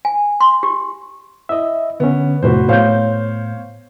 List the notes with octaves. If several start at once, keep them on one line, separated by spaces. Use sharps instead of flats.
G#5
C6
G4
E4 D#5 E5
D3 B3 C#4
F2 A2 C3 F#4 B4 C5
A2 B3 C5 C#5 F5 G6